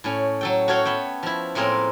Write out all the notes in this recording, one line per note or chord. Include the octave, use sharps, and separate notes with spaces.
A2 C#4
F#3 A4 G5
F#4 A4 C#5 F5 G5
B3 E5 G5
F3 E4
A2 A#3 C4 G#4 A#4